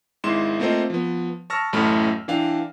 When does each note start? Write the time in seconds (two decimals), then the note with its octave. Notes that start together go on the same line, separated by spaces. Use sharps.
0.24 G#1 G#2 E4 C6 E7
0.59 A3 A#3 C4 F4 C5 D#5
0.90 F3 B3
1.50 A5 C#6 E6 F6 A#6
1.73 A1 F#2 A2 A3 B5 F6
2.28 E3 D4 F5 G5